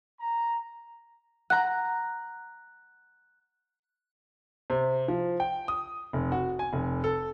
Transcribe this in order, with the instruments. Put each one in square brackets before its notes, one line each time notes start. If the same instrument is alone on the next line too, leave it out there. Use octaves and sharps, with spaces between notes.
[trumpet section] A#5
[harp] F#5 A#5 [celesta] F#6
[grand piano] C3
F3
G5
D#6
F1
F#4
G#5
F1
A4